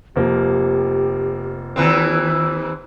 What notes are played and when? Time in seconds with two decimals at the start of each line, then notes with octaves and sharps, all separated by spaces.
0.16 F1 F3 A#3 G4
1.76 D#2 E3 C4 F4